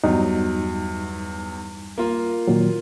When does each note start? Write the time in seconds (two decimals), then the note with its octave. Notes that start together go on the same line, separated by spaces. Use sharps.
0.04 E2 G2 F#3 G3 D#4
1.98 A#3 F4
2.48 A#2 D#3 F#3